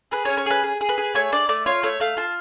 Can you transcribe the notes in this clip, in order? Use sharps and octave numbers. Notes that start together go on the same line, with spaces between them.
G#4 B4
C#5
C#4
C#5
G#4 B4
G#4
G#4
B4
G#4
A3 C#5
D4 D5
A3 D5
F4 C#5
A3 C#5
A3 F5
F4 A5